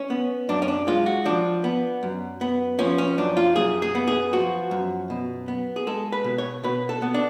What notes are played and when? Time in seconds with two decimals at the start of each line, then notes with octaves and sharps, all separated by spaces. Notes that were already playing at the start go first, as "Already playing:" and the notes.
Already playing: C#4
0.10 B3
0.49 F#2 D4
0.62 C#4
0.68 D4
0.87 G#3 F4
1.06 F#4
1.25 F3 D4
1.64 B3
2.03 F#2
2.41 B3
2.79 F3 C#4
2.98 C#4
3.18 F#2 D4
3.37 F4
3.56 F#2 G#4
3.82 G#4
3.95 B3
4.08 G#4
4.33 F3 F#4
4.71 F#2
5.10 B2
5.48 B3
5.76 G#4
5.87 G#3 A4
6.12 B4
6.24 B2
6.38 C#5
6.63 B2 B4
6.89 A4
7.02 B3
7.14 D4